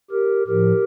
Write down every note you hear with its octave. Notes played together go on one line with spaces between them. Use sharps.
G4 A#4
A2 F3 G4 A#4